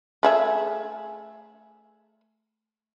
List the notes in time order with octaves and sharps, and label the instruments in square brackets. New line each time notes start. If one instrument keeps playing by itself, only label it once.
[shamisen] A3 G#4 E5